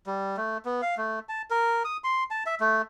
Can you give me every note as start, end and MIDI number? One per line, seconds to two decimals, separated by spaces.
0.07 0.37 55
0.37 0.58 57
0.65 0.81 59
0.82 0.95 77
0.97 1.19 57
1.29 1.42 81
1.50 1.83 70
1.85 1.97 87
2.04 2.24 84
2.31 2.43 81
2.46 2.55 76
2.60 2.82 57